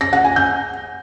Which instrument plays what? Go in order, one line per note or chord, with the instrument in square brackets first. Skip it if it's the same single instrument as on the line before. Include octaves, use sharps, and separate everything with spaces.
[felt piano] A#6
F#5
G#5
G6